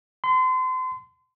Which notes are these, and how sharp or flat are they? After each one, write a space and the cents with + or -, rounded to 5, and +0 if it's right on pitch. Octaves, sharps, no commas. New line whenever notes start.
C6 -35